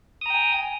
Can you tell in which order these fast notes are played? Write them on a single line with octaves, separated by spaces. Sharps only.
D#6 A#5 G5 G#5